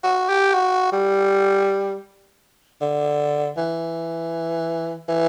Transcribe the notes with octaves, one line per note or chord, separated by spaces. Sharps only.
F#4
G4
F#4
G3
D3
E3
E3